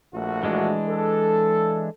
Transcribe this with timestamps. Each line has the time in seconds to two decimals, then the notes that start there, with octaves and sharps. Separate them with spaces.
0.13 A#1 A3 F#4
0.43 E3 G#3 D4
0.88 A4